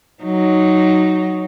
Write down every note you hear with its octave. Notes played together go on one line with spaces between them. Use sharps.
F#3 D#4